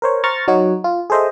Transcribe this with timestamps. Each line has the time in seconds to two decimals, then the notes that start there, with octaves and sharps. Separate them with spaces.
0.02 A#4 C5 C#5
0.24 C5 A#5 C#6 F6 A6
0.48 F#3 D#4 F#4 C#5
0.84 F4
1.10 G#4 A4 C5 D#5 E5